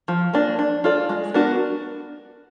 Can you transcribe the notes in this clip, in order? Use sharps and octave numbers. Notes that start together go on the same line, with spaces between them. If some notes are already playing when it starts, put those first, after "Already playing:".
F3
A#3 D4
D4
F4 A4 D5
G#3
B3 D4 F#4 A#4